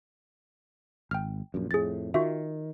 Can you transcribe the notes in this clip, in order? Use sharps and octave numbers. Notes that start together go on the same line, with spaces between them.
G#1 G5 F6
A#1 F#2
F2 A2 G#4 A6
D#3 F4 F#4 E5